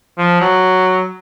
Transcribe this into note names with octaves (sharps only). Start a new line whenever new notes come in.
F3
F#3